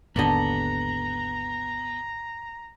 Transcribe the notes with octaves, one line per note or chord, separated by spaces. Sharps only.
G#1 D#2 D3 B3 G4 A4 D#5 A#5